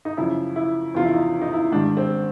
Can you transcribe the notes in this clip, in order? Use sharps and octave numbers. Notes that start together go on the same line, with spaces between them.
D#4
F#2 C#3 F3 E4
E4
E2 C3 F3 F4
E4
D#4
D#4
E4
G#2 D#3 G3 D4
C4